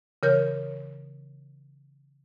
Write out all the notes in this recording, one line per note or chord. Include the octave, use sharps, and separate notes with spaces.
C#3 E3 A#4 C#5 G6